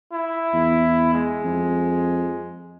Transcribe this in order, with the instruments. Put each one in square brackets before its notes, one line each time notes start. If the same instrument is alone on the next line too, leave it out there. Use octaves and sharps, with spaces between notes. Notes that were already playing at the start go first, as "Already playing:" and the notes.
[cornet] E4
[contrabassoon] E2
[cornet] G#3
[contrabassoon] F2